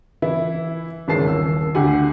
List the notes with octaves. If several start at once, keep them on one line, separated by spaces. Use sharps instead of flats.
E3 E4 E5
G#1 C#3 E3 A5 C7
D#1 E6
D2 G4 F#5 G#5